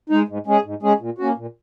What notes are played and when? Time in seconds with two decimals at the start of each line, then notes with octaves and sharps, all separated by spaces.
0.10 G#3 D#4
0.28 G#2
0.47 G#3 C#4 G#4
0.64 G#2
0.82 G#3 C#4 G#4
1.00 A#2
1.18 A#3 C#4 F#4
1.37 A#2